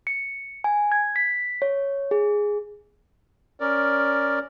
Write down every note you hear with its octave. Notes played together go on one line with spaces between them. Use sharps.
C#7
G#5
G#6
B6
C#5
G#4
C#4 A#4 D5